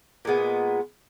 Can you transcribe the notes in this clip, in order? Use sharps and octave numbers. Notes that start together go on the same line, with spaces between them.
A#2 G#3 B3